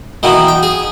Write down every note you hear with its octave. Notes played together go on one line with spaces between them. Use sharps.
B2 D#3 E3 A#3 B3
G5
G#4